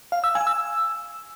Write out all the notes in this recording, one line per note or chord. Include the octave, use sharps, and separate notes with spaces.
F5
E6
G#5
E6